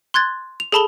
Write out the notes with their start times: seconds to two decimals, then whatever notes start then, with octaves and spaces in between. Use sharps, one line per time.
0.14 C6 F#6 G#6 A6
0.60 F7
0.72 G#4 A4 A5 B5 F7 G7